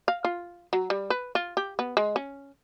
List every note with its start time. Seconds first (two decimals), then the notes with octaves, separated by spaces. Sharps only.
0.08 F5
0.25 F4
0.73 F#3
0.90 G3
1.10 B4
1.35 F4
1.57 G4
1.79 B3
1.97 G#3
2.16 C#4